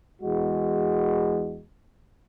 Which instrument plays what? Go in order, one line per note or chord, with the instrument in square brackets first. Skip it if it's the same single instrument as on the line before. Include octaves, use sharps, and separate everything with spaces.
[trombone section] E2 G#3 F#4